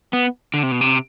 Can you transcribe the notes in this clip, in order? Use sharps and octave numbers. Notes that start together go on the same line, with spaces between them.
B3
D3
C3
B2
C3